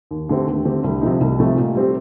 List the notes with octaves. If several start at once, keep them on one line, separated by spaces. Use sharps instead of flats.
D#2
D3 A3 C4 G4
D#2
D3 A3 C4 G4
C2
C3 F3 A3 D#4
C2
C3 F3 A3 D#4
A#2
G3 C4 G4